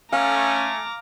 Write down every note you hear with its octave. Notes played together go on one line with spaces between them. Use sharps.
A3 C#4 F5 G#5 A#5 D6